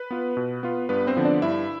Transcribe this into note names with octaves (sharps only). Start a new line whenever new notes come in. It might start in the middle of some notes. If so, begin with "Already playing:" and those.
Already playing: B4
B3 F4
B2
B3 F4
G2 B3 B4
C4 C5
D3 F3 B3
D4 D5
G2 E4 E5